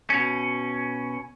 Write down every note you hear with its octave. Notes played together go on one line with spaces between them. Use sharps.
B2 C#4